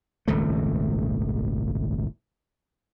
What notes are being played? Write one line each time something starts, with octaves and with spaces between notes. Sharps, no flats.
D#1 G#1 C#2 A3